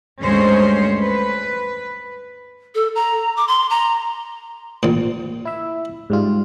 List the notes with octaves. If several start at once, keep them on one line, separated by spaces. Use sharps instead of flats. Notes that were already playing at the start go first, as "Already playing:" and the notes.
D2 G2 G#3 C#4 C5 C#5
B4
A4
A#5
D6
C6
A#5
A1 A#2
E4 E5
G#2 G3 F4